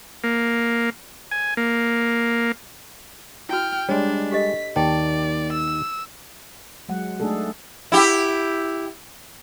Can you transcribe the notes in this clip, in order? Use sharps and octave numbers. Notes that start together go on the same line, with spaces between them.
A#3
G#5
A#3
E4 F#4 G5 F6
G3 G#3 D4 C#5
G4 A4 D#5 B6
D#2 D#3 D5 G5 A5
E6
F#3 G#3 F#5
G#3 A3 D4 D#4 G#4 A4
E4 G4